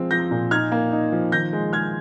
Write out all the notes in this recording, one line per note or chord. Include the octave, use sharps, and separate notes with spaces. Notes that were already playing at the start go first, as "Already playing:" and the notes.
Already playing: F3 G#3 C4
F3 G6 A#6
A#2
D#4 F6 G#6
A#3
D#4
F3
D#3 G6 A#6
G#3
G#3 F6 G#6